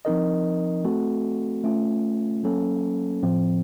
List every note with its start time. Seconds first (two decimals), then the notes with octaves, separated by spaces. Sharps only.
0.05 F3 C4 D#4 A#4 D#5
0.84 A3 C4 F#4 A4
1.64 A3 C#4 F4
2.43 F#3 A#3 C#4 A4
3.23 A2 F3 C4